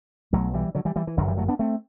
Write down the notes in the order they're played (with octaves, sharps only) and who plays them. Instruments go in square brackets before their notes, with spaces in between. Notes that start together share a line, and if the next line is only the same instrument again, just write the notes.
[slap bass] B1 B2 F#3 A3
E3 G3
D3 F#3
E3 G3
E3 G3
E3
G1 F#2 D3 F#3
E3 G3
F#3 A3
B3 D4
A3 C4